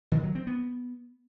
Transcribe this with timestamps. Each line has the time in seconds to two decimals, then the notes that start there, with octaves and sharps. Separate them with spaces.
0.12 D#3
0.23 F#3
0.35 C4
0.47 B3